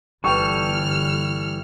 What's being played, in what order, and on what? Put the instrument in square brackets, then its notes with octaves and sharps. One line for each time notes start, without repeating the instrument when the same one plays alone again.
[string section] G1 F6 [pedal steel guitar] E3 G3 A4 [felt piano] B4 G5 C#6